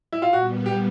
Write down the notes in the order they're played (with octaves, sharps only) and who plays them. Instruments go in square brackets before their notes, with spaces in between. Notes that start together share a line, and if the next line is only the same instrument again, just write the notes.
[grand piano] E4
F4
[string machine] A#2 G3 B3 [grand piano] F#4
[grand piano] G4